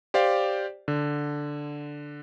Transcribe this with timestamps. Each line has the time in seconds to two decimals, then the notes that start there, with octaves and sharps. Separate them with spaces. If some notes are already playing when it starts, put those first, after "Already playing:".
0.14 G4 C5 D5 F5
0.88 D3